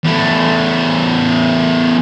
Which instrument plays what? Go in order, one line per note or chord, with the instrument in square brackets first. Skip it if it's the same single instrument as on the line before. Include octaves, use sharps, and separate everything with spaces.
[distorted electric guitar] E2 A3